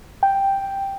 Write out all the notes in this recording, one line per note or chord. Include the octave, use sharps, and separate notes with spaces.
G5